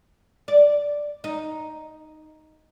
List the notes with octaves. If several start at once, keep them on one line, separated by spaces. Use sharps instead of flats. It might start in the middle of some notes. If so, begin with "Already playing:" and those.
D5
D#4